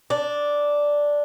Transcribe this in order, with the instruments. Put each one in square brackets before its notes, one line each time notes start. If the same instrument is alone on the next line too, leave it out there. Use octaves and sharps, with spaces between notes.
[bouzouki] D4